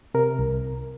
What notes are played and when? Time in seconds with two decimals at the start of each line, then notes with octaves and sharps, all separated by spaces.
0.14 C3 A#4
0.39 C2